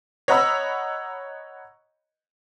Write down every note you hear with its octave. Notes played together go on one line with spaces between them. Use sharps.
C#5 D#5 F#5 A#5 B5 E6